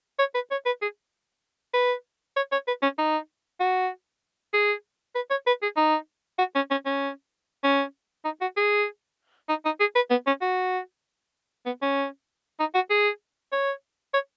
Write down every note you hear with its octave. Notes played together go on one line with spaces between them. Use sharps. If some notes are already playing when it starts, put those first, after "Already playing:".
C#5
B4
C#5
B4
G#4
B4
C#5
C#5
B4
C#4
D#4
F#4
G#4
B4
C#5
B4
G#4
D#4
F#4
C#4
C#4
C#4
C#4
D#4
F#4
G#4
D#4
D#4
G#4
B4
B3
C#4
F#4
B3
C#4
D#4
F#4
G#4
C#5
C#5